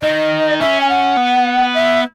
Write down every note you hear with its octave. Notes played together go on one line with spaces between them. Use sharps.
D#3 D#5
C#4 E5
G#5
F#5
B3
E5